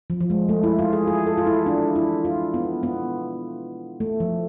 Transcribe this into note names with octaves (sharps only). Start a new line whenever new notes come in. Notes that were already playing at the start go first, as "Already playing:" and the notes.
F3
F3
G#3
A3
E4
F4
G#4
G#4
A4
F4
E4
D4
E4
F4
B3
B3
A3
F3